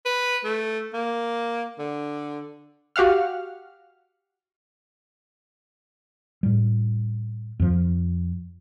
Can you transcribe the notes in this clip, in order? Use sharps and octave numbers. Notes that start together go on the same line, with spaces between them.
B4
A3
A#3
D3
F#4 G4 F5 F#5 F6
A2 G3
F2 F3